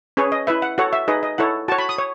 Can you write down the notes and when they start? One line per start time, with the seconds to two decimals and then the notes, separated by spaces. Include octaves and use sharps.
0.17 C#4 G#4 B4 C#5
0.32 D#5
0.47 E4 B4 E5
0.62 F#5
0.78 F#4 A4 C#5 F#5
0.93 E5
1.08 D#4 G#4 B4 D#5
1.23 D#5
1.38 E4 A4 C#5 F#5
1.68 F#4 A5
1.72 C#5
1.78 B5
1.89 D#6
1.98 C#5